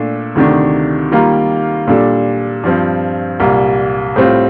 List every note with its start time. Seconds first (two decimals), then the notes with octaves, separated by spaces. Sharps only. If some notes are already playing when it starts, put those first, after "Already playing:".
Already playing: A#2 A3 D4 A4
0.35 D2 C3 D#3 A3 D4
1.11 D#3 G3 A#3 F4
1.87 A#2 G3 D4 A4
2.63 G2 F3 C4
3.40 C2 A#2 G3 A#3
4.16 A2 G3 C4 F4